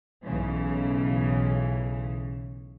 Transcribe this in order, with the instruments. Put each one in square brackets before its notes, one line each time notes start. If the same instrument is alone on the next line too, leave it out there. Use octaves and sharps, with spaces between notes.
[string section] B1 C#3 E3